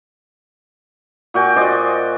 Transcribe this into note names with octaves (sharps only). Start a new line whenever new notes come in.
A#2 F#4 G5 G#5
C5 D5 D#5 G#5